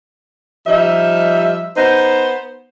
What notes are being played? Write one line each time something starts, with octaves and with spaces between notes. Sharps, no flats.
F3 G3 D#4 E5
B3 D#4 C5